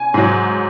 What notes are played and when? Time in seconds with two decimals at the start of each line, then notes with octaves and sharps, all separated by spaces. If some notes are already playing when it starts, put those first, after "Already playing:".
Already playing: G#5
0.14 G#2 F#3